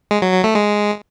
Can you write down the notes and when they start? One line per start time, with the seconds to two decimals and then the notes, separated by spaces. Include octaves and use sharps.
0.11 G#3
0.22 F#3
0.33 F#3
0.44 A3
0.55 G#3